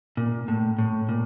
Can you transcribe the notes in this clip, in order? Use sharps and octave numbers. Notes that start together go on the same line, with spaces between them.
A#2
A2
A2
A#2